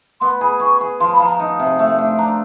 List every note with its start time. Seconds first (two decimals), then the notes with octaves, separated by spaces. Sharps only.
0.21 B3 C6
0.40 G#4 B5
0.60 G#4 C#6
0.81 G#4
1.00 F3 C6
1.13 B5
1.20 F3
1.26 A#5
1.40 D#4
1.59 C3
1.79 A3
1.98 D4
2.18 D4 A#5